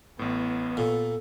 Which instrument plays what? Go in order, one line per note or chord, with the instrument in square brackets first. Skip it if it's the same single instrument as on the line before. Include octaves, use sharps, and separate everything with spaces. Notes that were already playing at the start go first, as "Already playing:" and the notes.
[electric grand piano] A1 A2 [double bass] B3
[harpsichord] A#2 [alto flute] A4